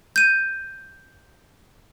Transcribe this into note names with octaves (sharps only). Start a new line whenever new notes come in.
G6 D#7